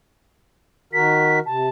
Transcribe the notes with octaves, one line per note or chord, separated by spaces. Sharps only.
D#3 F#4 A#4 B6
C3 A5